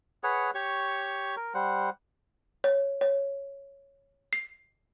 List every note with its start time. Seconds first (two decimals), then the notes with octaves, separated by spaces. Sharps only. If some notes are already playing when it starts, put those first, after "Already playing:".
0.23 G#4 B4 C#5 F#5
0.55 G4 C#5 C#6
1.37 A#4
1.54 G3 C5 F#5
2.64 C#5
3.01 C#5
4.33 C7